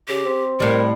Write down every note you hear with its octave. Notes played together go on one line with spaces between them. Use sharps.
C#3 G4
C4
A2 G3 A#4